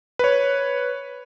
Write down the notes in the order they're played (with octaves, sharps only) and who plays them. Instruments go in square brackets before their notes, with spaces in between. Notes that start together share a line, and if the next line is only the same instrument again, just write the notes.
[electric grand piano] B4 C#5